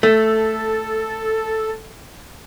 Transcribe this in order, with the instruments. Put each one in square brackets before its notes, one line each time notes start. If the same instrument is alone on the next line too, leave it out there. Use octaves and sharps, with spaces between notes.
[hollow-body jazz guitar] A3 [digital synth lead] A4